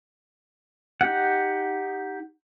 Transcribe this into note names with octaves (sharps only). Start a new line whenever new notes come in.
D#4 G4 F#5